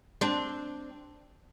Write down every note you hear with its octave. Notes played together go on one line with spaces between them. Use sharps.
C4 D4